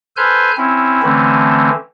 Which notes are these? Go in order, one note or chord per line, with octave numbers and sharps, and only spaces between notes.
A4 B4 C5 G#5 F6 G6
C4 C#4 E4
D3 E3 A3 C4 C#4